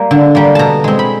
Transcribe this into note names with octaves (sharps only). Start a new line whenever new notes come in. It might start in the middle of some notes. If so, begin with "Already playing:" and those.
Already playing: G3 A#3
D3
G3 A#3
B2 A5 A#5
G#3 C4
B5